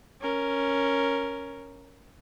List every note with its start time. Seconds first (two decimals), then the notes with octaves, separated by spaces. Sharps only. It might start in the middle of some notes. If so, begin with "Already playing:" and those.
0.21 C#4 A#4